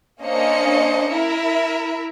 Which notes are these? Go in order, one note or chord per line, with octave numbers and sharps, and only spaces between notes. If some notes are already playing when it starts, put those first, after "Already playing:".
A#3 C#4 D4 C5 D#5 C#7
E4 A#4 E5